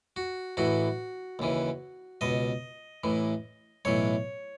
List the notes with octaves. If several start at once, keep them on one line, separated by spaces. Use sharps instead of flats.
F#4
A1 A2 E3 F#4
D#2 C#3 E3
C#2 B2 D#5
A1 A2 E3
B1 A2 E3 C#5